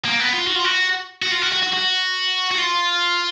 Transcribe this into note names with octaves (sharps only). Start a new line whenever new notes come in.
A#3
B3
F4
F#4
F4
F#4
F#4
F4
F#4
F#4
F#4
F#4
F#4
F4